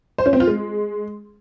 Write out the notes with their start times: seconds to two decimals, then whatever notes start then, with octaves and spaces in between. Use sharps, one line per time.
0.18 C5
0.26 C#4
0.33 C4
0.40 F4
0.47 G#3